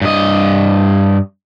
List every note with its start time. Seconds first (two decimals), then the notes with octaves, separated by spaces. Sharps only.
0.02 G2 D#5